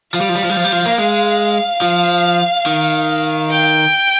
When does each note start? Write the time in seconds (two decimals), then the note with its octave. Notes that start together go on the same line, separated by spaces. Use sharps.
0.14 F3 F5
0.21 G3
0.29 F3
0.35 G3
0.43 F3
0.50 G3
0.57 F3
0.65 G3
0.72 F3
0.86 A#3
0.98 G#3
1.82 F3
2.66 D#3
3.50 G5